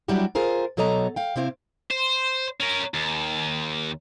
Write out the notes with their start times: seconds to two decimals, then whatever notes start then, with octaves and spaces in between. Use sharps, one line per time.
0.08 F#3 G3 D4 E4 F#4 G4
0.35 F4 G#4 A#4 C5
0.77 B2 F#3 A4 C#5 D#5 A#5
1.16 F5 G5
1.36 C3 C4 E4 D5 F5
1.91 C5
2.60 C#4 A#4
2.94 D#2